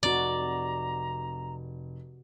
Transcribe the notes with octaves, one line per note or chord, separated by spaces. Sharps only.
F1 C3 F#4 D5 A#5